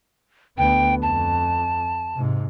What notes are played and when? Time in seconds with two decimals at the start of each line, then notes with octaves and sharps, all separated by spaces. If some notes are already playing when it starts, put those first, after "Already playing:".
0.58 D2 B3 G5
1.02 F2 A5
2.15 G#2 C3